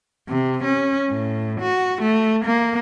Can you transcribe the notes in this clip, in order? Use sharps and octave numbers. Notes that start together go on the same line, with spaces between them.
C3
C#4
A2
F#4
A3
A#3